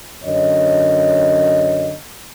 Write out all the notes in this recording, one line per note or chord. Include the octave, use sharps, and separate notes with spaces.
F#2 D3 C#5 D#5